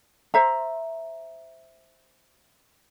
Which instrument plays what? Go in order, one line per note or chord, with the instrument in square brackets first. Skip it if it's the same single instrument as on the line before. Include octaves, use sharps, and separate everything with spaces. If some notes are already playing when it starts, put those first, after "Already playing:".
[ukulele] C5 E5 A#5